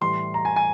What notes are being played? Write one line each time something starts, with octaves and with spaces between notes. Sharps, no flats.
A2 E3 G3 C6
A#5
G#5
G#5